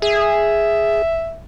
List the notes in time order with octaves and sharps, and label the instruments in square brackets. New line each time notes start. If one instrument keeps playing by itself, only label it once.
[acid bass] G#4 [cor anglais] E5